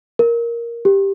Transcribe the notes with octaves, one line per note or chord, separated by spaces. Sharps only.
A#4
G4